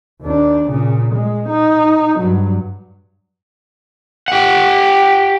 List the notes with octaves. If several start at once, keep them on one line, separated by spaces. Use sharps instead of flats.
D#2 D4
A#2 C#3
G#3
D#4
G2 F#3
G4 F#5